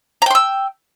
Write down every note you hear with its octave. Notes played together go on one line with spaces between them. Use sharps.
G5 A#5 C6 E6